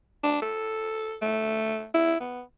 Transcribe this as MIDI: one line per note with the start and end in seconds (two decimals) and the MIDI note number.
0.23 0.40 62
0.42 1.16 69
1.22 1.85 57
1.94 2.18 64
2.20 2.42 59